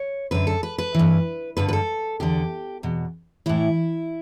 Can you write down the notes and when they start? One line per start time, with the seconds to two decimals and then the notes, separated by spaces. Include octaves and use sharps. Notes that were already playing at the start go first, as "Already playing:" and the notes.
Already playing: C#5
0.31 F#2 D3 B4
0.47 A4
0.63 B4
0.78 B4
0.95 G2 E3
1.57 G2 D3 B4
1.68 B4
1.73 A4
2.20 E2 D3 G4
2.83 E2 B2
3.46 A2 E3 E4